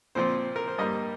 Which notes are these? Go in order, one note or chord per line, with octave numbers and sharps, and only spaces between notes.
A#2 F3 C4 C5
A#4
C5
G2 G3 A#3 D#5